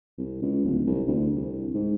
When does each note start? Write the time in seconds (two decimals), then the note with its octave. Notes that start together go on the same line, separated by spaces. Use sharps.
0.18 C2
0.42 C#2
0.65 D1
0.87 C2
1.07 D2
1.35 C2
1.74 G#2